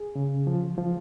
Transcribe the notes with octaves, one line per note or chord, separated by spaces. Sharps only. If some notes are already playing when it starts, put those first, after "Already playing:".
Already playing: G#4
C#3
F3
F3